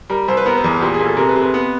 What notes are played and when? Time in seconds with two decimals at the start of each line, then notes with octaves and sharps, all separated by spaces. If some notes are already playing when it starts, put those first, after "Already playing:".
0.10 G3 A#4
0.28 C2 C5
0.37 B4
0.46 B3 A#4
0.57 B4
0.64 E2
0.81 A#2 G4
0.94 G#4
0.99 A#2
1.06 A4
1.17 C3 A#4
1.29 B4
1.35 C3
1.41 B4
1.54 B3